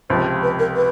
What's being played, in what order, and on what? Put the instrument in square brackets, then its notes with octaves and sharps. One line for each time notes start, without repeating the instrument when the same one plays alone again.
[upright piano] C#2 C3 F3 [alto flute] C5
[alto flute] B4
A#4
B4